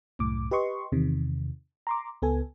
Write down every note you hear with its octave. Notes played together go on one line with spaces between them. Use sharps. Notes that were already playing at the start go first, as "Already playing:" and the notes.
C2 F#2 A2 D6
G4 B4 D#5 C6 C#6
E2 C3 D#3
A#5 C6 D6
C#2 B3 A4 G#5